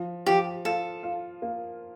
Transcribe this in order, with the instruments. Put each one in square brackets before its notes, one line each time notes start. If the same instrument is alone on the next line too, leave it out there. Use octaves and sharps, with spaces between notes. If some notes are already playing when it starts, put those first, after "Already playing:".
Already playing: [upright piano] F3
[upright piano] F3 [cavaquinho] G4
[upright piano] F4 [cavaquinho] A4
[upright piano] F4
A#3